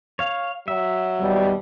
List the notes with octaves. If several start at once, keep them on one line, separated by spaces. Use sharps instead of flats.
C#5 F5
F#3 E5
D#2 B2 G3